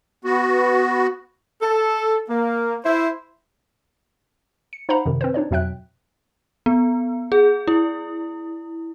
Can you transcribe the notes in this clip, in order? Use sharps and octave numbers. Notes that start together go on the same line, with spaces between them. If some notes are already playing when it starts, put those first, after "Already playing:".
B3 F#4
A4
A#3
E4 C5
C#7
D#4 C5 F5 F#5 A#5 B5
F#2 C3 D#3
C4 B4 C5
D4 D#4 C#5 D5
F2 B2 F#3 E5 G5 F#6
B3
G#4
E4